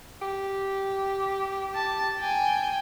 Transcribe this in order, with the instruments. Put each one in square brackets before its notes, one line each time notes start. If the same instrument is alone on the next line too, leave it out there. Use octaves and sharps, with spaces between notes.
[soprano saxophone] G4
[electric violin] A5
G5 G#5